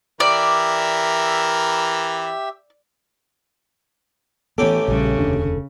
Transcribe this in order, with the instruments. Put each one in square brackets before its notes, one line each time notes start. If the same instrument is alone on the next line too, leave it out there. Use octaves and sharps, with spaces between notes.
[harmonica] E3 A#4 [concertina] G4 E5 E6 [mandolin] D5
[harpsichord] A1 C#4 G4 [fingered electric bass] E3 B3 [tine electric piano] A4
[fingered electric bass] A#1 G3 [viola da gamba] C#3
[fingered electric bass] F1 D#2 D4